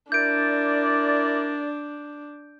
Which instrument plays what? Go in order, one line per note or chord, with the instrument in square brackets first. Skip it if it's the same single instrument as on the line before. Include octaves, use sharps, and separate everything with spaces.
[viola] D4 [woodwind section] E4 A#4 D5 [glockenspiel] G6 D7